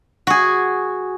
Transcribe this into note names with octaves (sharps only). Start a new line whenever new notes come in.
F#4 G#4